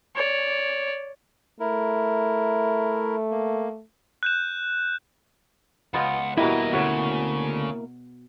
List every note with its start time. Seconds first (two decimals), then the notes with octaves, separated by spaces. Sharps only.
0.15 C#5 D5
1.60 A3 E4 A#4
3.31 A#3
4.23 F#6 G6 E7
5.94 C#2 B3 F4 D#5 F#5
6.38 D#2 B2 E3 G3 A#3 E4 D#5
6.73 D2 C#3 F#4 G#4 C#5